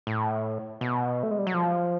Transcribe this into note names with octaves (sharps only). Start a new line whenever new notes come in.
A2
B2
A3
G#3
G3
F#3
F3